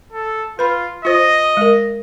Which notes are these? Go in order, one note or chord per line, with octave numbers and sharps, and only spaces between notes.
A4
F4 B4 B5
F4 C5 D#5
G#3 A#4